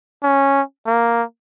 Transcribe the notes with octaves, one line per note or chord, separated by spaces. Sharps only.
C#4
A#3